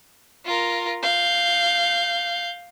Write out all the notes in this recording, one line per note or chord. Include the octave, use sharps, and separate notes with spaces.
F4 A#4
F5 G6